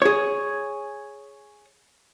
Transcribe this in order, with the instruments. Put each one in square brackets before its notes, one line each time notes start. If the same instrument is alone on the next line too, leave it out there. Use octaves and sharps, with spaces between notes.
[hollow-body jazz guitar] G#4 C#5